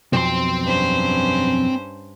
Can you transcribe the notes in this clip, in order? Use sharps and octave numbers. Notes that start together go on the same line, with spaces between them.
B1 F2 C4 C6
G2 C#4 C5